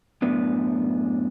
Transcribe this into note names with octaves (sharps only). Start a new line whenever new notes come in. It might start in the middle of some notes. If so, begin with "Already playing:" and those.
F#2 A2 B3 D4